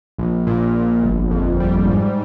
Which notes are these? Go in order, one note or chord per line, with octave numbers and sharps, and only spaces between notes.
A#1
A#2
A#1
G1
F2
G3
G#2